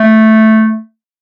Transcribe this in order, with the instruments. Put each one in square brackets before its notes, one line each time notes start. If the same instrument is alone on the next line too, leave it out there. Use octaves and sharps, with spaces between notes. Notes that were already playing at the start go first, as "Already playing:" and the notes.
Already playing: [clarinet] A3